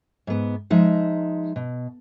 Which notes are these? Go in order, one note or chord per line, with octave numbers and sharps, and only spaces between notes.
G#2 B3
F3 G#3 D#4 E5
B2